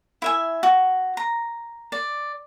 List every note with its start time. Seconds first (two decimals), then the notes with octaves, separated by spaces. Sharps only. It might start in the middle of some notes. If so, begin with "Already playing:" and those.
0.22 E4 E5 G#5
0.63 F#4
1.17 A#5
1.92 D5